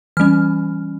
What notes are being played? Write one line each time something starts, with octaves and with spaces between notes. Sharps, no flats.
E3 G3 C#4 F6